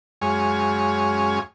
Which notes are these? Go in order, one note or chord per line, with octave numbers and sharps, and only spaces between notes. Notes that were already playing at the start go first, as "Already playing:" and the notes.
F#2 G#3 G#4 C#5 F5 C#6